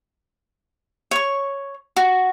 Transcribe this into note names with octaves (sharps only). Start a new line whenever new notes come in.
C#5 C#6
F#4